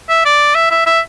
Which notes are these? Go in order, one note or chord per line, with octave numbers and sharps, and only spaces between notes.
E5
D5
E5
E5
E5